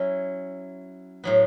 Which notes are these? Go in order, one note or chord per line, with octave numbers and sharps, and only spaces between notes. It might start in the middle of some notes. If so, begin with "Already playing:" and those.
Already playing: F#3 C#4 E4
A2 F#3 B3